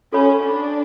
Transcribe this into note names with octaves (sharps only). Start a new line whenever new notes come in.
C#4 F#4 A4 C#5 F#5 B5
D4